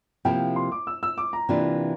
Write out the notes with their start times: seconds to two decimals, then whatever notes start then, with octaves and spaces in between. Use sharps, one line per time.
0.25 C3 F3 A#3 E4 G5
0.56 C6
0.72 D6
0.87 E6
1.03 E6
1.18 D6
1.33 A#5
1.49 C3 E3 A#3 D4 F4